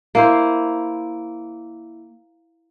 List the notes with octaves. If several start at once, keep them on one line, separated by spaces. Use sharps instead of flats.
A#3 E4 C5